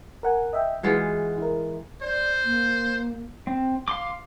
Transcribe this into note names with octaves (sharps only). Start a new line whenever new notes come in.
A#4 F#5 G#5
D#5 E5 G5
E3 G#3 F4 F#4
E4 A#4
C5 D5
A#3
C4
F5 C6 D6